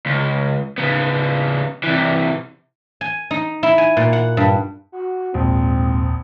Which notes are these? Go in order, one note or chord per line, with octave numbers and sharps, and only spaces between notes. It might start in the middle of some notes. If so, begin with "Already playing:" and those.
C#2
C#3 B3
C3 E3
G#5
D#4
E4
G#5
A#2
F#5
G2
F#4
A#1 D#2 G#2 C4